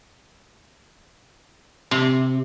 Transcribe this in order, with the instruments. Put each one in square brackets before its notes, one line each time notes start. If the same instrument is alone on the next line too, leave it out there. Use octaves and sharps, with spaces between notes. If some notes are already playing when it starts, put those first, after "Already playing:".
[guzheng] C3